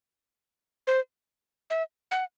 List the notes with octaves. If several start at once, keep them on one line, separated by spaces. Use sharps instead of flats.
C5
E5
F#5